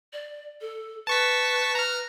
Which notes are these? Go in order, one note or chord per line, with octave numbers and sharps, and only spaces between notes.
D5
A4
B4 A5 C#6 B6
A#5 F6